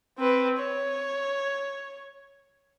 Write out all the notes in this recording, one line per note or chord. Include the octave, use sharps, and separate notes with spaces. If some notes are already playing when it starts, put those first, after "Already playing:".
C4 B4
C#5